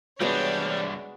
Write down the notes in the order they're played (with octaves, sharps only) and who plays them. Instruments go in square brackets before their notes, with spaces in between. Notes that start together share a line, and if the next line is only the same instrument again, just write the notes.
[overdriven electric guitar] C2 D4 [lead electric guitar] G3 [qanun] G#3 B3 F#4 [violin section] C#5 D5